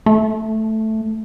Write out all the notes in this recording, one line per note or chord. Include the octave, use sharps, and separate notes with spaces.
A3